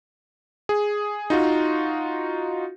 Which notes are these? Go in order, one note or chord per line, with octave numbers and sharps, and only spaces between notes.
G#4
D#4 F4 F#4